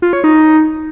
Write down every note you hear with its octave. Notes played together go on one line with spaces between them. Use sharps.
F4
C#5
D#4